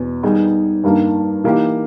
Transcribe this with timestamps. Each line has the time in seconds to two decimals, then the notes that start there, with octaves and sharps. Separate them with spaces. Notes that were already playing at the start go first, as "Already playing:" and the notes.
Already playing: E2 B2
0.23 D#3 G3 B3 D#4 G#4
0.83 G2 D#3 G3 A#3
1.44 E3 A#3 D#4 G4